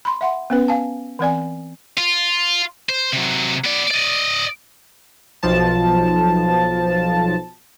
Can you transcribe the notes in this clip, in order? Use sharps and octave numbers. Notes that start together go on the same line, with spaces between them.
B5 C6
E5 F#5 C6
B3 C#4 B4
F5 G#5 A5
E3 C4 D5 G#5
F4
C5
C3 F#3
B3 D5
D5 D#5
B1 F3 A5